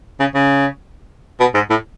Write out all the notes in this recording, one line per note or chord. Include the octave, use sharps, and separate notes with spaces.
C#3
C#3
B2
G#2
A2